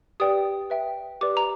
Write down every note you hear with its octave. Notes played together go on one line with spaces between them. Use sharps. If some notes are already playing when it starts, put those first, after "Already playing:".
G4 B4 D5 G5 D#6
B4 E5 G5
G4 B4 D5 D6
A#5